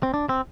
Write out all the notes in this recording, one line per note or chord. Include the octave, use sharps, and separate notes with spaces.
C4
D4
C4